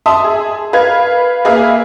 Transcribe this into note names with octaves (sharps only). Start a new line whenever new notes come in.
E5 A5 C6 D#6
G#4
B4 F5 G#6
A#3 G#4 B4 E5 F5